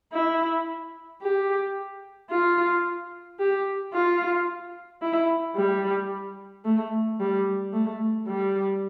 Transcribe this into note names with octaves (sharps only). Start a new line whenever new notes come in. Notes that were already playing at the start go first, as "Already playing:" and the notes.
E4
G4
F4
G4
F4
E4
G3
A3
G3
A3
G3